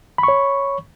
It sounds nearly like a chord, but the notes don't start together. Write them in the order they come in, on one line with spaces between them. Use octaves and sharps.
B5 C#6 C#5